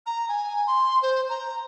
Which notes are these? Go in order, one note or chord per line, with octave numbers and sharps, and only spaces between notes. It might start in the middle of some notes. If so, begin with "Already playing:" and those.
A#5
G#5
C6
C5
A#5